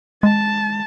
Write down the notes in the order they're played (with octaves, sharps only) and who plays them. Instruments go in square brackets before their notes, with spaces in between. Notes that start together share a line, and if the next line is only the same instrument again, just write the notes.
[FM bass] G#3 [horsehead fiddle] A5